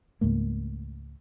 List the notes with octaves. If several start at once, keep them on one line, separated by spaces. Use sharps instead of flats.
C#2 G#2 A3 A#3